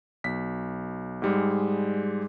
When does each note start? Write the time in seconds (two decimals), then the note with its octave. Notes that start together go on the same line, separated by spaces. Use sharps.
0.24 B1 B6
1.22 G#2 G3 G#3